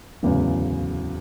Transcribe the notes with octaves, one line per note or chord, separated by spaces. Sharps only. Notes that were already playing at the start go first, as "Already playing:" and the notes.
D1 E2 C#3